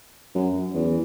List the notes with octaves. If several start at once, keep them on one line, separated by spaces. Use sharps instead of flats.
F#2
E2